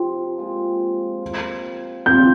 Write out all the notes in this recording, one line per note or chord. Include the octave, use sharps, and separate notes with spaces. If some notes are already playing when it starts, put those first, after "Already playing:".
Already playing: C3 F3 C4
A#2 G#3 C4 F4
F3 A#3 F4
F3 C4 F4 G6